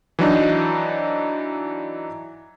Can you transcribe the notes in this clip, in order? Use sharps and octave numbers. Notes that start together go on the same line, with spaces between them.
E3 F#3 D4 D#4